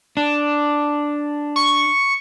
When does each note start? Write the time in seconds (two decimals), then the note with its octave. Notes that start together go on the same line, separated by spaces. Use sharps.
0.17 D4
1.56 C#6